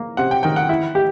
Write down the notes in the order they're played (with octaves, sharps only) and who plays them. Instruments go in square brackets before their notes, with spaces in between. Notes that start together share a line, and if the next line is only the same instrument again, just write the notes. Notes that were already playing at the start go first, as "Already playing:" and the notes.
Already playing: [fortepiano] A#3
[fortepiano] C3 [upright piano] F#5
[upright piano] G5
[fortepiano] D#3 [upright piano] G5
[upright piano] F#5
[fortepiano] E4
G4